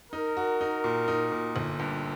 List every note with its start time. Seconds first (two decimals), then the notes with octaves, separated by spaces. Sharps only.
0.13 D#4 A#4
0.37 F#4
0.61 D#4
0.84 A#2
1.08 D#4
1.32 A#2
1.56 G1
1.79 G2